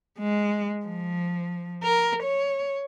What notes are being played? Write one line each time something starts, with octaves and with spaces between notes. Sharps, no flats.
G#3
F3
A#4
C#5